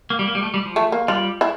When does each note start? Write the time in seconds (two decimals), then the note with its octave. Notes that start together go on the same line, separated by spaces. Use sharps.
0.10 A#3
0.19 G3
0.27 A#3
0.35 G3
0.42 A3
0.54 G3
0.65 F3
0.76 A3
0.92 A#3
1.08 G3 F4
1.41 E4